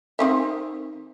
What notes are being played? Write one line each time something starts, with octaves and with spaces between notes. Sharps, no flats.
D#3 C4 E5